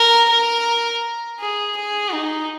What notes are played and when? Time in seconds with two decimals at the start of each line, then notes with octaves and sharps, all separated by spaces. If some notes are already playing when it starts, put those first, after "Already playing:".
Already playing: A#4
0.29 A#4
1.40 G#4
1.77 G#4
2.13 D#4